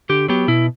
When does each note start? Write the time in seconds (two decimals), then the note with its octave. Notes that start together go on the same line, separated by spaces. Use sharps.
0.09 D3 G4
0.28 F#3 B3 G4
0.48 B2 E4